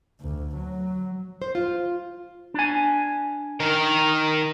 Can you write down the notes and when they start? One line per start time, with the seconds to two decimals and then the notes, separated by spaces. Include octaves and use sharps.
0.21 D2
0.56 F#3
1.42 C5
1.55 F4
2.54 D4 G#5
3.60 D#3 A#4